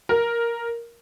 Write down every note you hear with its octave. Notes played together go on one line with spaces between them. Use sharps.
A#4